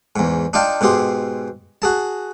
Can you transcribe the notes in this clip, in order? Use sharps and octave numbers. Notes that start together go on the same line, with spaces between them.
E2 G#2
D4 D#4 F4 F5 G5 A5
G#2 B2 G4 G#4 C6
F#4 G#4 A5